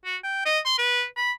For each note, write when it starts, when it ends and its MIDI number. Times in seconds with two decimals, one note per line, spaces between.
0.05 0.16 66
0.23 0.43 79
0.46 0.59 75
0.65 0.75 84
0.78 1.04 71
1.16 1.31 83